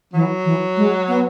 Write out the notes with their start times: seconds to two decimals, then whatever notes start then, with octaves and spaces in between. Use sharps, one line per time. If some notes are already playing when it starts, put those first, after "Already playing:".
0.14 E3 F#3
0.45 E3
0.77 G#3
1.08 B3